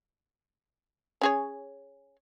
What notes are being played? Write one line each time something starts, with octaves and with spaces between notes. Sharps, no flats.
C#4 G#4 C#5